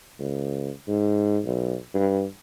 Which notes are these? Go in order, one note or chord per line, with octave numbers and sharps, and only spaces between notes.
C#2
G#2
B1
G2